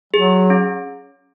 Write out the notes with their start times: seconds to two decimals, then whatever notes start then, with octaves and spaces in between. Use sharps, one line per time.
0.13 F#3 G#4
0.50 C#4